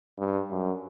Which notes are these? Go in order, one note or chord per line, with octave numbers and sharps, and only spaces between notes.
G2
F#2